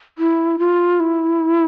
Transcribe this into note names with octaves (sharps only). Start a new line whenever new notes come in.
E4
F4
E4